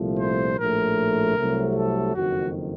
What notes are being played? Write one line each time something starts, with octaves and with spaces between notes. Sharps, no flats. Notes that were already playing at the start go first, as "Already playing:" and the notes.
Already playing: C2 A#2 F3 A3
C5
A#1 A2 A3 A#4
C2 C3 F#3 A3
A4
F#1 F2 D#3 F#4